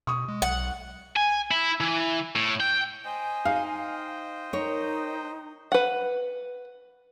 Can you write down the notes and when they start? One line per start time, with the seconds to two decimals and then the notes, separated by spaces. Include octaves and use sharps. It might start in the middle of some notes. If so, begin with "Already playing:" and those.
0.07 B2 C#6 D#6
0.28 G#3
0.42 B1 F#5
1.17 G#5
1.51 E4
1.81 E3
2.36 A2
2.60 G5
3.05 C5 D#5 G5 G#5
3.45 D#4 F5
4.53 D#4 A#4 C#5
5.72 B4 F#5